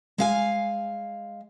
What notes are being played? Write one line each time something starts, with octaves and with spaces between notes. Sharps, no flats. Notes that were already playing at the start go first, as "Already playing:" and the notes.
G#3 F5 G#5